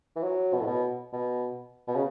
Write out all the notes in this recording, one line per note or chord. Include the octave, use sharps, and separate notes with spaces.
E3
F#3
B2
A2
B2
B2
B2
C#3